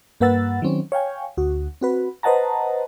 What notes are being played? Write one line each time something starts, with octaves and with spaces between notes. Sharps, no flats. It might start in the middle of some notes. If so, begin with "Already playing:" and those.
G2 A#3 B4 F#5 E6 A6
D#3 F#3 C4 C#4
C#5 F5 G5 G#5
D2 F#4
C4 F#4 B4
B4 C5 D#5 F#5 A5 A#5